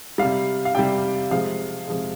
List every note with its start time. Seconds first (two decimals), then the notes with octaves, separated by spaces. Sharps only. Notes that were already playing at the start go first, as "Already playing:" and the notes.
0.18 C3 G3 F5
0.65 F5
0.75 C3 G3 G5
1.31 C3 F3 G#3 F5
1.87 C3 F3 G#3